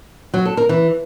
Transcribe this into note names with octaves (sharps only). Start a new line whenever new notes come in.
F#3
A4
A#4
E3